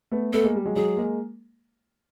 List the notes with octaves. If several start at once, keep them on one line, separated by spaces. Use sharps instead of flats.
A3 B3
A3 B3 A4
G#3 A#3
G3
F#3 G#3
F#3 G#3 G#4
G#3 A#3